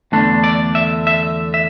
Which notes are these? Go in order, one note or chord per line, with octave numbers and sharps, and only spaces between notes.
E2 D3 A3 D4
D5
E5
E5
E5